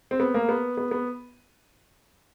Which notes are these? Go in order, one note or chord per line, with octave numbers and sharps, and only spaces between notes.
C4
B3
A#3
B3
B3
B3